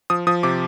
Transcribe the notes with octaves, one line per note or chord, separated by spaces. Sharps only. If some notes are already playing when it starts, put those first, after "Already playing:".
F3 D#6
F3 D#6
C3 D6